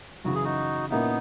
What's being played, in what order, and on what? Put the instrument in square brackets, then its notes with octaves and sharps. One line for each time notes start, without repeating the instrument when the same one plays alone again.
[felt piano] F#2 C#3 E3 [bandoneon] F#4
[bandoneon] G#4
D#4 F#4
[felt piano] A#2 A#3 C#4 E4 [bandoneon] B3 D#4